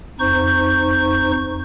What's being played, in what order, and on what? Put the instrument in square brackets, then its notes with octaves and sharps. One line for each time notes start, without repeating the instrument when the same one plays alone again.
[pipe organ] F2 D#4 C5 C#6 G6